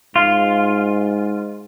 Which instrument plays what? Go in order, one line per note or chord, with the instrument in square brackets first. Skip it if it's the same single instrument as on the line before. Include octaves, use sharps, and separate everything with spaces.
[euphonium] G#2 [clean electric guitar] F4